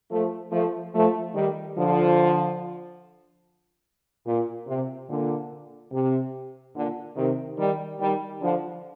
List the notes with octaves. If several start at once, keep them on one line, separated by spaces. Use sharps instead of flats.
F3 A3
F3 A3
F3 A3
D#3 G3
D3 F3
A#2
C3
A#2 D3
C3
A#2 D3
C3 D#3
D#3 G3
D#3 G3
D3 F3